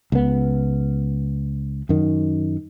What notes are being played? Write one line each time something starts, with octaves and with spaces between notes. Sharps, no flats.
C#2 B3
F#2 D#3